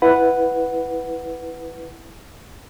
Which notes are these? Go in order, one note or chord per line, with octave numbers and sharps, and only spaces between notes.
E4 B4 F#5